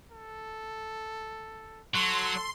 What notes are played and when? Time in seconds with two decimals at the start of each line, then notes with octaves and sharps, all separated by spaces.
0.11 A4
1.95 F#3 A4 C6